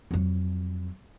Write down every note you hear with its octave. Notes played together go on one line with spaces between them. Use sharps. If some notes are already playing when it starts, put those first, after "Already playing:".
F2 F#3